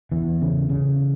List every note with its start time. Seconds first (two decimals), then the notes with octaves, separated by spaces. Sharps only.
0.12 E2 E3
0.41 C#3
0.69 C#3